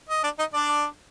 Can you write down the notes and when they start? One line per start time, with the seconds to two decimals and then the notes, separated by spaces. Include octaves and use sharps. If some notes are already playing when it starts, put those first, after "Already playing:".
0.09 D#5
0.24 D4 D5
0.39 D#4 D#5
0.54 D4 D5